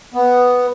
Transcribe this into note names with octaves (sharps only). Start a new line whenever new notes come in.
B3